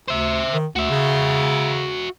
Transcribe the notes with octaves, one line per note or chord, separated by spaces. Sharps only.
D2 C5 E5
D#3
D2 F#4 E5
C#3